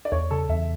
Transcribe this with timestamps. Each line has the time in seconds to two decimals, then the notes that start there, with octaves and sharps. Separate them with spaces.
0.05 D5
0.12 E2 C#5
0.31 C#3 A4
0.49 E2 E5